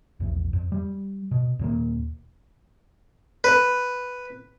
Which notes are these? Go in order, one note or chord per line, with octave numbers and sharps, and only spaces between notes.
A#1 E2
F2
G3
B2
D#2 A#2 A#3
B4